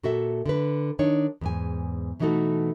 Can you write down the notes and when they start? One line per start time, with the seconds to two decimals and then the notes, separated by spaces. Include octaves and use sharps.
0.03 A#2 F#4 A4 E5
0.46 D3 B4
0.99 D#3 D4 D#4 C#5
1.41 E2 G#2 G#5
2.20 B2 E3 A3 D#4 F#4 A4